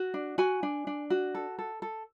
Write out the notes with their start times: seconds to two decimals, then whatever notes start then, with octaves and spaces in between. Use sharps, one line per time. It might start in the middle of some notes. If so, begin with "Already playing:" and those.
Already playing: F#4
0.14 D4
0.38 F#4 G#5
0.63 D4
0.87 D4
1.10 F#4
1.35 A4
1.59 A4
1.82 A4